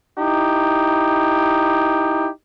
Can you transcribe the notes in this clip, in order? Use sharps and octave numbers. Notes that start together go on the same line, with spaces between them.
D#4 E4 G4